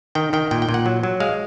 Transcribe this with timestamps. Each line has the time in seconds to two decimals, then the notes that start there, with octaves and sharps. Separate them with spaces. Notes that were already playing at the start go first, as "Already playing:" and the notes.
0.15 D#3 G5
0.33 D#3 G5
0.51 A#2 G5
0.62 G5
0.69 A#2
0.74 F#5
0.86 F#3
1.03 F#3
1.20 G#3 F5